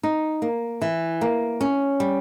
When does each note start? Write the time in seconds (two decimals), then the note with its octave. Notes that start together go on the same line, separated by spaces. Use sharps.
0.03 D#4
0.42 A#3
0.82 E3
1.21 A#3
1.61 C#4
2.00 G3